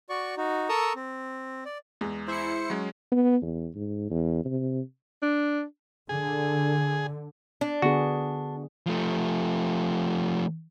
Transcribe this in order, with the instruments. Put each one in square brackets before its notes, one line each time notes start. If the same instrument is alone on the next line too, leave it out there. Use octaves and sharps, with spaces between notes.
[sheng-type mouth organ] F#4 D5 C#6
D#4 F#4
A4 A#4 A#5 C#6 D#6 E6
C4
D5
[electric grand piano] E2 [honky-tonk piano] G#3
[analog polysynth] E4 C#7 [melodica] C5
[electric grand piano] F#3 G#3 C#4
[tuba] B3
E2
G#2
E2
C3
[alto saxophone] D4
[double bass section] D3 [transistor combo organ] G#4
[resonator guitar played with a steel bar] D4
[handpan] D3 B3 G#4 [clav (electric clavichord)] F#4
[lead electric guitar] F3 A3